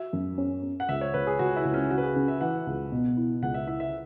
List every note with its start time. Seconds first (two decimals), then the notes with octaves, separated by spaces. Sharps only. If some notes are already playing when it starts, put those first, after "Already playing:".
Already playing: F#4 E5
0.13 F#2
0.38 C#4
0.63 C#4
0.80 F#5
0.88 C#2 E5
1.01 C#5
1.14 C#2 B4
1.27 G#4
1.39 C#2 F#4
1.56 E4
1.65 C#2
1.74 C#4
1.90 C#3 F#4
1.98 B4
2.03 G#4
2.16 C#3
2.28 E5
2.41 E3 F#5
2.67 C#2
2.92 B2
3.17 E4
3.42 C#2 F#5
3.54 E5
3.67 E4 E5
3.80 E5